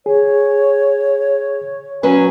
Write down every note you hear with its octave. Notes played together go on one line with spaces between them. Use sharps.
G#4 C#5
F#3 C#4 B4 G#5